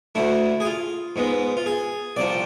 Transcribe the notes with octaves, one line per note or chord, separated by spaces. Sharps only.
D2 D3 A3 E4
G#4
F4
G#2 G#3 B3
F4
G#4
C2 C3 F3 D5